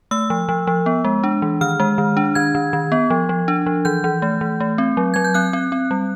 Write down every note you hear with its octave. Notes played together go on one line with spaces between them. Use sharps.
A3 E6
F3
F3
F3
B3
G#3
D4
E3
D#3 F6
G#3
D#3
D4
D#3 G#6
D#3
D#3
B3
F3
F3
D4
F3
E3 G6
E3
A3
E3
A3
C4
F#3
F#3 G#6
G6
C4 F#6
C4
C4
G3